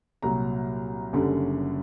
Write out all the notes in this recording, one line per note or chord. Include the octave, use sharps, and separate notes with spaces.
C2 A#2 F#3 A#5
F#1 F#2 D3 G3